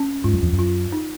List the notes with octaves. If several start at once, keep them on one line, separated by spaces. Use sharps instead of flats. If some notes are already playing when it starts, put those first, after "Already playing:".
Already playing: C#4
G#2 F4
F#2
F2
F#2
F4
D#4